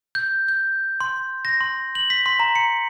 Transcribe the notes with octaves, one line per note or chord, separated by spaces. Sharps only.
G6
G6
C6
A#6
C6
F#7
B6
C6
A#5
C#7